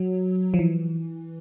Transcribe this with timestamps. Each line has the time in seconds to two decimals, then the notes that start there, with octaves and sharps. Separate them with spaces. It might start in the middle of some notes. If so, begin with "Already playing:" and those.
Already playing: F#3
0.54 F3
0.59 E3